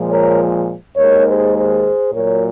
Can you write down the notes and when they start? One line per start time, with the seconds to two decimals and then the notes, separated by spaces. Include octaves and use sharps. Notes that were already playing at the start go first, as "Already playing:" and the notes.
Already playing: A#2 F3 G#3
0.10 A#4 C#5
0.97 D#2 D#3 G#3 A#4 C#5
1.26 G#4 C5
1.55 G#4 C5
2.13 A#2 F#3 A#4 C#5